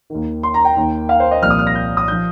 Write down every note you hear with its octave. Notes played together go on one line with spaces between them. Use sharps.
D#2 D#3
C6
A#5
G5
D#2 D#3
F5
C5
D#5
C2 A#2 F3 F6
D#6
F6
A#6
G6
D#6
G6
F3